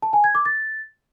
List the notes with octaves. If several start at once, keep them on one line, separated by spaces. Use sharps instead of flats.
A5
G#5
G#6
D6
A6